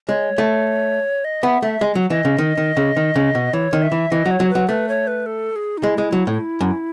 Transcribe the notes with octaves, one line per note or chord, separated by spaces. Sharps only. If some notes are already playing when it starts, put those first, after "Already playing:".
G#3 C#5
A3
D#5
B3 E5
A3 E5
G#3
F#3
E3 D#5
C#3
D#3
D#3
C#3
D#3
C#3
B2
E3 C#5
D#3
E5
E3
E3 D#5
F#3
C#5
F#3
B4
F#3
A3 B4
C#5
B4
A4
G#4
D#4
G#3 E4
G#3
F#3
A2
F#2